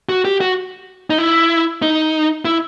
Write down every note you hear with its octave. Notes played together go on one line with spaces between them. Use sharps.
F#4
G4
F#4
D#4
E4
D#4
E4